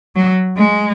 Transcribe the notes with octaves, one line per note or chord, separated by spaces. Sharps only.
F#3
G#3